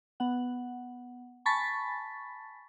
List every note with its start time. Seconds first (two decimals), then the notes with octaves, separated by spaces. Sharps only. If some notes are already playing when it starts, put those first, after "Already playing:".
0.20 B3 F#5
1.46 G#5 A5 B5 C#6 A6 B6